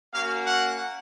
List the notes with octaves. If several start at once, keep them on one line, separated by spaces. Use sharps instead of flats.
A#3 C#4 F#4 F5
F#5